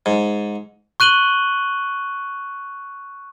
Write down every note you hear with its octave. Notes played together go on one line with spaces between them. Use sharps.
G#2
C#6 F#6 D#7 F#7 G7